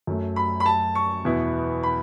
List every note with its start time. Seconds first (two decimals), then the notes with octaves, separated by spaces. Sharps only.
0.07 F#2 F#3 A3
0.36 B5
0.60 B5
0.66 A5
0.95 C#6
1.25 E2 B2 B3 E4
1.83 B5